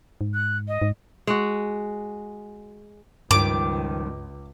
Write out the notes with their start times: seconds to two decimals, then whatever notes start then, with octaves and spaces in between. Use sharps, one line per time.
0.21 G#2
0.34 F#6
0.68 D#5
0.82 G#2
1.27 G#3 F#4
3.31 C#2 G2 D#3 F3 G3 D6